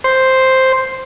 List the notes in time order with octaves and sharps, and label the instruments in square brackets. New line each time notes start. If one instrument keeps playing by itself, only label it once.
[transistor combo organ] C5